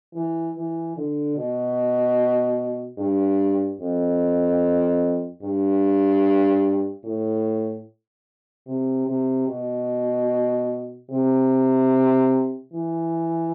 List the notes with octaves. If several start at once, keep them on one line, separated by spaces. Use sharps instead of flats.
E3
E3
D3
B2
G2
F2
G2
A2
C3
C3
B2
C3
E3